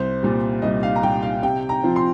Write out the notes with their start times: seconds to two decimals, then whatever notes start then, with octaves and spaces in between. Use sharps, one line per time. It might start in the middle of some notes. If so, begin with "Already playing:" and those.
Already playing: C2 C5
0.23 A#2 G3
0.62 C2 D#5
0.83 F5
0.96 A#5
1.03 A#2 G3 G5
1.23 F5
1.43 C3 G5
1.69 A#5
1.84 F3 C4 F4
1.96 C6